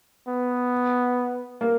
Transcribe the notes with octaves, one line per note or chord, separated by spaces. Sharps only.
B3
A#3